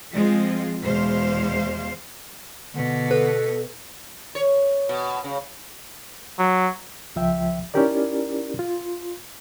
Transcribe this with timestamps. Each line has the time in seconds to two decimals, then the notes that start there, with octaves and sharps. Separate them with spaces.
0.13 F3 G#3 C4 F4
0.84 E2 B2 G#3 C5 F5
2.75 B2 D3 B3
3.11 A4 B4
4.35 C#5
4.89 B2
5.24 C#3
6.39 F#3
7.16 C#2 F3 E5 G5
7.74 C#4 D#4 E4 G4 A#4 D5
8.59 F4